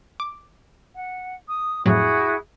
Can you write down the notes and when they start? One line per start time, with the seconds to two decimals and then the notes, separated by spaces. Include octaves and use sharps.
0.20 D6
0.93 F#5
1.46 D#6
1.86 F2 A2 F#3 E4 F#4 G#4